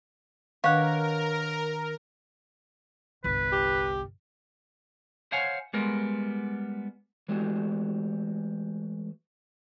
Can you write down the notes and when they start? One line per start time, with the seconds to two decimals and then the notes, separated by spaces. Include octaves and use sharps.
0.64 D#3 D4 A#4 B4 C#5 F5 F#5
3.24 G1 C2 B4
3.52 G4
5.32 C5 C#5 F5 F#5 G#5
5.73 G3 G#3 B3 A#4
7.28 E3 G#3 A3 F#4 G4